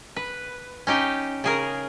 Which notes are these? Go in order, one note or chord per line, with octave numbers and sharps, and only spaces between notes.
B4
C#4 D#4 G4
C#3 G#4 A#4